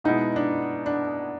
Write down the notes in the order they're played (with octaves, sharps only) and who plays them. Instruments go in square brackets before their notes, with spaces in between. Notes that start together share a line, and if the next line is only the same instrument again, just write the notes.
[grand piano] B2 G#3 B3 E4 [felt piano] D#4
[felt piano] D4
D4